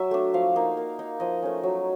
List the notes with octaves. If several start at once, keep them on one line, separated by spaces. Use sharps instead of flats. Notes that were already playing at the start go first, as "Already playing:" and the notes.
Already playing: F#3 E5
A3 D4
F3 F5
A#3 D#4
A#3
D#4
F3 D#5
A3 C#4
F#3